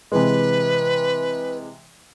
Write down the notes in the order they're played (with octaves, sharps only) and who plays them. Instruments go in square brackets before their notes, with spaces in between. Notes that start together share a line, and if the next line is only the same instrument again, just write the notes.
[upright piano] C3 E3 G#3 [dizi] B4